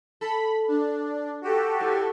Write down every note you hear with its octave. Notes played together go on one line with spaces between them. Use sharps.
A4 B5
D4
F#4 G4 A4
A2